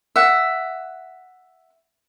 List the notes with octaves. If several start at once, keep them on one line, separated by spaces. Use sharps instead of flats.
E5 F#5